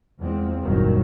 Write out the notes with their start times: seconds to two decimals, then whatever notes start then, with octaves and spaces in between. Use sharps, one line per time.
0.19 E2 F3 G#3 C4
0.62 F#1 C2 F#2 A#2 D#3 F#3